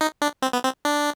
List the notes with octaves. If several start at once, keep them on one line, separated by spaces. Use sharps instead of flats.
D#4
D4
C4
B3
C4
D4